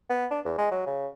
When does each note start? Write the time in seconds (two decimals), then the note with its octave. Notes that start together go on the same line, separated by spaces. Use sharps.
0.10 B3
0.31 D4
0.45 E2
0.58 G#3
0.71 F#3
0.86 C#3